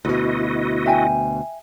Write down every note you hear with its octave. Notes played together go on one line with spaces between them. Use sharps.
D2 B2 E4 F#4 D#5
E5 G5 G#5